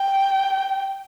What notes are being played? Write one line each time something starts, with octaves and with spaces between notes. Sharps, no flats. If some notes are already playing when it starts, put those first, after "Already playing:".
Already playing: G5